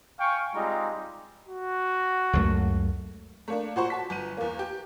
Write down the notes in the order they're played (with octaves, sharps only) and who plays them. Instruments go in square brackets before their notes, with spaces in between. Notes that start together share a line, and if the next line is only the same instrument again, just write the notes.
[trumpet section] F5 G5 G#5 C#6
G3 G#3 C4 D#4 F4 A#5
[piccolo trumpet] F#4
[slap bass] C#2 F#2 A3
[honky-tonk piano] A3 A#3 D4
A#2 F#4 C5 C#6
F#4 A5 B6
G1 D#7
E2 A#3
G4